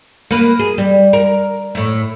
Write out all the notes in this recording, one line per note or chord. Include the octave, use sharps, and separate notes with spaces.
A#3 B4
G#4
G3
A#4
A2 E4